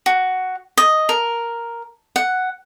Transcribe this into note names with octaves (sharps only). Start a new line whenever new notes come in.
F#4
D#5
A#4
F#5